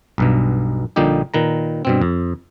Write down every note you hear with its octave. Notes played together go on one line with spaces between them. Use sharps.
B1 G2 B2
A#1 A#2 D3 G3 D#4 G4
A#2 D#3 B4 A#5
G2 B2 C4
F2